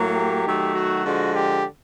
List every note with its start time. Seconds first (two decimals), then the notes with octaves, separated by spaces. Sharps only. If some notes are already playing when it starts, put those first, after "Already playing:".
Already playing: A2 F#3 A#3
0.14 G4
0.44 D#3 F#3 A3
0.74 F#4
1.04 D3 F3 G#3
1.34 G4